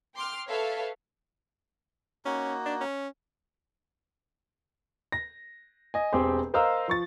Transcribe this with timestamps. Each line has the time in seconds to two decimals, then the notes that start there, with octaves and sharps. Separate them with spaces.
0.14 G5 C6 D6 F6
0.47 A4 B4 C#5 E5 F5 A5
2.25 A#3 C#4 D#4 F#4
2.66 D4
2.81 C#4
5.12 A#6
5.94 D#5 G#5
6.13 E1 C4 G4 G#4 C5 C6
6.54 A#4 C5 D#5 F5 A#5 E6
6.88 F3 C#6 A6